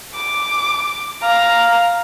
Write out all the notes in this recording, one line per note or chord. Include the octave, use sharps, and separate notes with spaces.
D6
F5 A#5